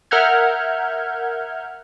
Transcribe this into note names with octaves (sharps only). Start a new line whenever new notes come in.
A#4 E5 F#5 F6 G6 G#6